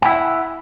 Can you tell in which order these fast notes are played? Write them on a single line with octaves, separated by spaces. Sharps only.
G5 E4 F#5 E5